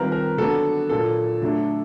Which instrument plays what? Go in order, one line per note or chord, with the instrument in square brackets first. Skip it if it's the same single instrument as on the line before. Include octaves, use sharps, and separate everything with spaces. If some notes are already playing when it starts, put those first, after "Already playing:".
Already playing: [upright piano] D#3 G3 C4 F4 [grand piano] A#4 B4
[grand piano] A#4
[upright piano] D3 F#3 B3 D4 F#4 [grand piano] A4
[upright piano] A#2 F#3 A#3 [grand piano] A4
[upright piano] D3 F#3 A3 D4